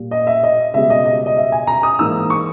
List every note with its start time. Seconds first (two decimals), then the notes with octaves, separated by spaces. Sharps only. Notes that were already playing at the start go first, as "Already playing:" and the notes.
Already playing: A#2 G3
0.11 D#5
0.27 E5
0.43 D#5
0.74 C#2 B2 G3 E5
0.90 D#5
1.05 D#5
1.26 D#5
1.37 E5
1.52 G#5
1.67 A#5
1.83 D#6
1.99 G#2 E3 A#3 D#4 E6
2.30 C#6